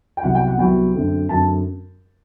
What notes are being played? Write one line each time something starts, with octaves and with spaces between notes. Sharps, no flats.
G5
C2 C3 F#3 B3 F#5
G5
F#5
C2 C3 F#3 B3 G5
F#2 D3 A3 C4
F#2 D3 A3 C4 A5